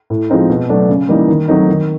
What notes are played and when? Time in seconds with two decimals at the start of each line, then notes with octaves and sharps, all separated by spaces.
0.10 A2
0.30 F3 G#3 C4 D#4
0.50 B2
0.69 F#3 A3 D4
0.89 C#3
1.09 E3 G3 A#3 D#4
1.29 D#3
1.48 F#3 A3 C4 D#4
1.68 D#3